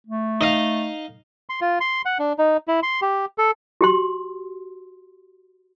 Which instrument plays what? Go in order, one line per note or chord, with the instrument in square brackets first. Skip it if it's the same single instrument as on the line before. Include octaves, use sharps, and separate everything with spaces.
[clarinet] A3
[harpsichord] D#4 D#5 F5
[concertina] C6
F4
C6
F#5
D4
D#4
E4
C6
G4
A4
[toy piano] F#4 G4 C6